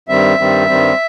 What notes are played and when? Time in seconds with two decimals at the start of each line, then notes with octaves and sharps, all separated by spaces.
0.08 G2 D#3 G3 C4 E5
0.38 G2 D#3 G3 C4
0.67 G2 D#3 G3 C4